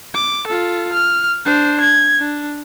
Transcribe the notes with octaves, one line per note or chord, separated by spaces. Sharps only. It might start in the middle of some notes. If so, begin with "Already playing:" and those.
D6
F4 A4
F6
D4 C5
G#6
D4